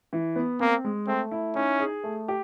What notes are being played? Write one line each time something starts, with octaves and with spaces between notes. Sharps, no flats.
E3
B3
A#3 C4
G#3
A3 C4
E4
C#4 D#4
G#4
A3
G4